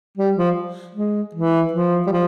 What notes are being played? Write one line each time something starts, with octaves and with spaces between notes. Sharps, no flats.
G3
F3
G#3
E3
F3
G3
F3